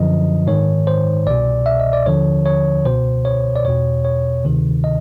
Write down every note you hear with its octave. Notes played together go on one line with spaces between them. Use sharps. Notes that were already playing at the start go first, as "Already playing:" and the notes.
Already playing: F#2 D3 F3 D#5
G#2 D#3 C#5
C5
C2 B2 D5
E5
D#5
D5
D#2 D3 F3 C#5
C#5
C#2 B2 C5
C#5
D5
E2 B2 C#5
C#5
D2 C3 D#3
D#5